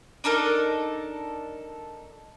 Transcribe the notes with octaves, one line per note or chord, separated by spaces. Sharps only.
D4 D#4 A4 A#4